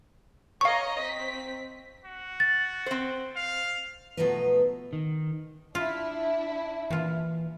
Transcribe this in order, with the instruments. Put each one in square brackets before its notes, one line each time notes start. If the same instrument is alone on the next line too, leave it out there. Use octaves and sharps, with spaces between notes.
[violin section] C#5 D#5 A#5 [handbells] F5 C#6
[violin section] C4 B6
[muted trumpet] F#4
[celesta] A6
[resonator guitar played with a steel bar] C4 C5
[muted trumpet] F5
[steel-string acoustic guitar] B2 F3 F#3 A3 D#4 B4
[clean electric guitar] D#3
[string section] D4 E4 [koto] F4
[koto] A#2 F4 [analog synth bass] E3